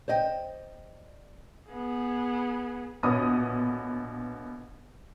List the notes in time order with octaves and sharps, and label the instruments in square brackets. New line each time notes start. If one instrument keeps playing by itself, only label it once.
[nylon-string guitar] C5 D5 D#5 G5
[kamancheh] B3 G#4
[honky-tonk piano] A#1 B2 D3 B3 C#5 D#6